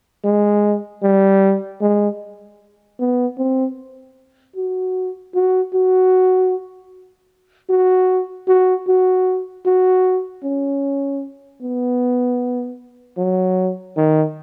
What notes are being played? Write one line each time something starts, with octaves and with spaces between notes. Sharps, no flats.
G#3
G3
G#3
B3
C4
F#4
F#4
F#4
F#4
F#4
F#4
F#4
C#4
B3
F#3
D#3